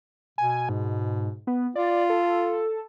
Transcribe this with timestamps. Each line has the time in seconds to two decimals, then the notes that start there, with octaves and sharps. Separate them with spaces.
0.38 B2 G#5
0.69 G#2
1.47 B3
1.76 F4 D5
2.10 A4